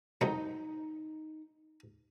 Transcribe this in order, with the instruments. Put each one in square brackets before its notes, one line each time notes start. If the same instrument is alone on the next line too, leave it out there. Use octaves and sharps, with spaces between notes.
[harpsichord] C2 F2 F#3 [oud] D#4